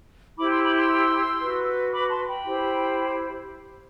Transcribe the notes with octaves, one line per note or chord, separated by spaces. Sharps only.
E4 G4 C5 B5 D6
C6 E6
B5 D6
C6 E6
F#4 B4
B5 D6
A5 C6
G5 B5
E4 G4 C5